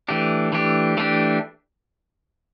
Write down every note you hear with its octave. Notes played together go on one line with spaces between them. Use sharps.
E3 A3 D4 G4
E3 A3 D4 G4
E3 A3 D4 G4